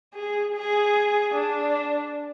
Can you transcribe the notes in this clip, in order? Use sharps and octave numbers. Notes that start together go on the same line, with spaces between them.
G#4
G#4
D4